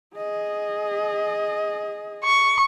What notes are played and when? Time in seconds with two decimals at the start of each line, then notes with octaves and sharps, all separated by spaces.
0.16 G#4 D#5
2.24 C#6